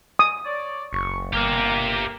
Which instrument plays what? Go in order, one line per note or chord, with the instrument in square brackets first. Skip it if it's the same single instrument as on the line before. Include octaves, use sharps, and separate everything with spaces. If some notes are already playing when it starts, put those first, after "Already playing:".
[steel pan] D#6
[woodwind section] C#5 D5
[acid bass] F#1 [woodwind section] C#6
[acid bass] G1 [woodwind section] A#3 [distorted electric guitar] G4 E5